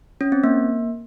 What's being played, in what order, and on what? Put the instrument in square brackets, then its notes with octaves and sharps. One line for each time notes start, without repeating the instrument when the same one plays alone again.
[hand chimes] C#4
C4
A#3